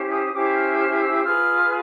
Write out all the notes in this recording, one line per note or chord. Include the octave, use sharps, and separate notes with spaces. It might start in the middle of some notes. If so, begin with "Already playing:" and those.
Already playing: C#4 E4 G4 C5
D#6
C#4 E4 G4 C5 D6
F6
F6
E6
F4 G#4 B4 F6